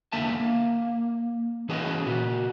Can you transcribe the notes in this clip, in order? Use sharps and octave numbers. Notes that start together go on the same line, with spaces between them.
E2 D3 A#3 E5 A5
A#3
E3 C#4 G#4 B4 C#5 D#5
A#2 F#4